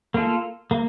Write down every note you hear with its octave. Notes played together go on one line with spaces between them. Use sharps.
A#3 F4 A4
A#3